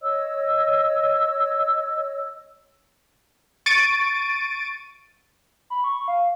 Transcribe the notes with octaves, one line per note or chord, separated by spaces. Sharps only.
C#5 D#5 E6
C#6 A6 D7 D#7
B5
C#6
F5